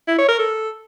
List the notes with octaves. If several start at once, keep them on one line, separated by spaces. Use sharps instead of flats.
E4
C#5
A#4
A4